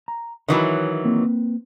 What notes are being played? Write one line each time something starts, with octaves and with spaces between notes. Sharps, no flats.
A#5
D#3 E3 F#3 C#5 E5 G#5
A#3 C4 B4